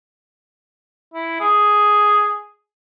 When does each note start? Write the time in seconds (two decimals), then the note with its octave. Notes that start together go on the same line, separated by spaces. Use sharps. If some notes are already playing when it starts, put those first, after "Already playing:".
1.14 E4
1.41 G#4